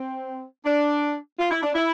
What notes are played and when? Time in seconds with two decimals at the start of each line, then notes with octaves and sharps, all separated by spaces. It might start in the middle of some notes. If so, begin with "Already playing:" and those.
Already playing: C4
0.65 D4
1.39 F4
1.51 E4
1.62 D4
1.74 E4